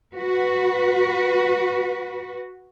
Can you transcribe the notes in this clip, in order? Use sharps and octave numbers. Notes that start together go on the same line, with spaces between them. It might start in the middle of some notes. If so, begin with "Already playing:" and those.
F#4 B4